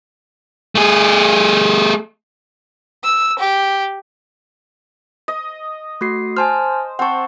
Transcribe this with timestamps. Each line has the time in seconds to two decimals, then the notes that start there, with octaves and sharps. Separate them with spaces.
0.75 A3 G#4
3.04 E6
3.39 G4
5.28 D#5
6.01 A3 F#4 C7
6.37 C5 G#5 A5 F6
6.99 C4 F#5 A5 C#6